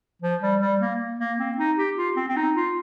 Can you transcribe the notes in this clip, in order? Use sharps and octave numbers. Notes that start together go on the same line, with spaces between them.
F3
G3
G3
A#3
A#3
C4
D#4
G4
F4
C4
C4
D#4
F4